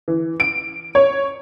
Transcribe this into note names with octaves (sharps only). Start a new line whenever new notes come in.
E3
D7
C#5